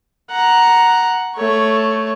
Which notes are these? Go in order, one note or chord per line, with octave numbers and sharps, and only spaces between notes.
F#5 A#5
A3 C#5